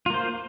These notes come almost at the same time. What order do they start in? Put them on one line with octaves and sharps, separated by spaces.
F4 A#3 C5